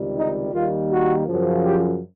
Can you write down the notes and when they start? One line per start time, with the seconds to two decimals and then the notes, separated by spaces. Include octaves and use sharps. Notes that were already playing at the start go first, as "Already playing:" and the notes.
Already playing: C#2 C3 D#3 G3
0.15 D#4
0.52 D#2 D#3 G3 A#3 F4
0.90 F#4
1.27 F#2 C#3 F3
1.64 G4